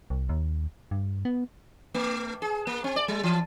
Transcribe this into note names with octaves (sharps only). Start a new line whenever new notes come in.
C2
D#2
G2
B3
A3
G#4
A#3
C4
D5
G3
E3